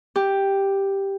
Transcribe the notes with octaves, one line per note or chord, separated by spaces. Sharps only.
G4